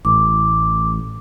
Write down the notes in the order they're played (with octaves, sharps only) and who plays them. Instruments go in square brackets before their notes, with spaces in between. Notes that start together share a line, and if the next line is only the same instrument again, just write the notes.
[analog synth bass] A1 [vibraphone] D6